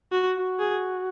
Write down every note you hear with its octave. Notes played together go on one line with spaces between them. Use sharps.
F#4
F#4
G#4